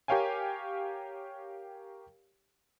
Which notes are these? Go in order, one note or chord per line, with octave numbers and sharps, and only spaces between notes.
G4 A#4 C#5 F5 G5 G#5